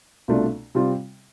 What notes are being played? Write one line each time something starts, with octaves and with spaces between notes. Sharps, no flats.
C2 B2 A3 D4 F4
C3 G3 C4 F4